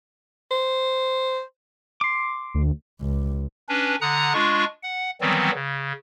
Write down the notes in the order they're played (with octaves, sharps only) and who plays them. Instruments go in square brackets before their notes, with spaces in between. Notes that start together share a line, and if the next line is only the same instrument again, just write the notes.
[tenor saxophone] C5
[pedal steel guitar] C6 D6
[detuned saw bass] D2
[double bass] C#2
[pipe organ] C#4 D4 B4
D3 F#5 A#5 D#6 F#6
G#3 D4 F4 C#6
F#5
D#3 E3 F#3 G3 B3 C4
C#3